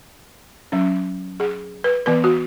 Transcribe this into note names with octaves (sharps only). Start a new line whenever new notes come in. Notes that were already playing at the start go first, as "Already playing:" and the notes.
F#3 C#4
G#4
B4
E3 B3 B4
F#4